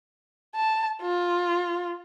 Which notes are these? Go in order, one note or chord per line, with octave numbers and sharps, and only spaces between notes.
A5
F4